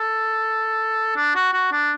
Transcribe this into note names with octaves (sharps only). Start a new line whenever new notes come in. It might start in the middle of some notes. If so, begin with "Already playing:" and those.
Already playing: A4
D4
F#4
F#4
D4